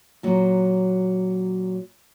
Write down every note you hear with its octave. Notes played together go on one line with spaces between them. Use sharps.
A#2 F#3